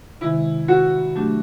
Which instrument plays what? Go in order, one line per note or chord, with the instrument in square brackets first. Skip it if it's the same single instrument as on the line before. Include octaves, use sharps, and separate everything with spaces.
[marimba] C3 D#3 G#3 [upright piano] E4
[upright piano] F#4
[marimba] F#3 A3 D4 G4